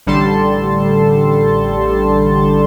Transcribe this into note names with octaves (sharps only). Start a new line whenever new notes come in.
A1 D3 G3 A4 A5 C6